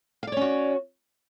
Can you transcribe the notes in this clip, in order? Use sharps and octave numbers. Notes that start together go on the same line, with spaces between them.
C#4 F#4 C#5 D5 F5